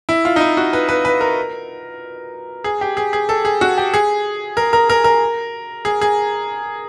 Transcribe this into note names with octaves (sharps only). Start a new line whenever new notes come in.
E4
F4
D#4
E4
F#4
B4
B4
B4
A#4
G#4
G4
G#4
G#4
A4
G#4
F#4
G4
G#4
A#4
A#4
A#4
A#4
G#4
G#4